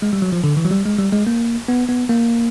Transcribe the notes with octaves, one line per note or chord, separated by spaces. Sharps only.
G#3
G3
F#3
F3
D3
E3
F#3
G3
G#3
G3
G#3
A#3
B3
B3
A#3